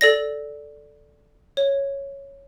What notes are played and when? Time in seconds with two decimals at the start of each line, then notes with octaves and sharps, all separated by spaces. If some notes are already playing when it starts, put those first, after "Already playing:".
0.01 A4 D5 A#6
1.57 C#5